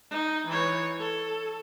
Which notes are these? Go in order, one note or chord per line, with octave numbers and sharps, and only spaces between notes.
D#4
E3 C#5
A4